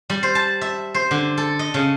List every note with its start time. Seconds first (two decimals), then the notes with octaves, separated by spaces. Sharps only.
0.10 G3
0.23 C5
0.35 A5
0.61 E5
0.94 C5
1.11 D3
1.38 A4
1.59 D#5
1.74 C#3